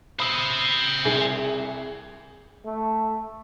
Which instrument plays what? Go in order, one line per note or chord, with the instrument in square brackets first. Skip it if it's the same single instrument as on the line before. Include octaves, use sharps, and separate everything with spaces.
[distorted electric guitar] C5 E5 [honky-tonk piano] B5 D#6
[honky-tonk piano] C2 G#4
[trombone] A3